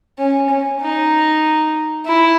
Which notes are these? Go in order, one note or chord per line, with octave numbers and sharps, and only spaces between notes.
C#4
C#4
D#4
E4